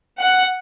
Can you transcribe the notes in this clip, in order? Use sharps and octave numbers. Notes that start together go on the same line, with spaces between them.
F#5